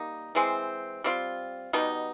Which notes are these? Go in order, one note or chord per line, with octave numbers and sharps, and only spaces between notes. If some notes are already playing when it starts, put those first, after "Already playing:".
Already playing: G3 A#3 D#4
E3 G#3 C4
G3 C4 F4
B2 G3 B3 D#4